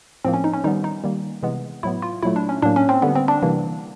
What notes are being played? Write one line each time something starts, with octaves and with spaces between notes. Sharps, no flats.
A2 F3 A#3 C4
C#4
D#4
C#4
D#3 G3 B3 D#4
D#4
D#3 G3 A#3
C3 E3 G#3 B3
A2 F#3 B3 E4
F4
A#2 F#3 A3 E4
D4
C#4
A2 F#3 A#3 D4
C#4
C4
D3 G3 A#3 B3
C4
D4
C3 E3 G3 A#3